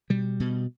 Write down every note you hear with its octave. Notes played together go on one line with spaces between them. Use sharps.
B2 G3
B2